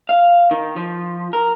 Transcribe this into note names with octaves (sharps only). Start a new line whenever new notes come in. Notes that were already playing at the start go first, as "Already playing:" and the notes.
F5
D#3
F3
A#4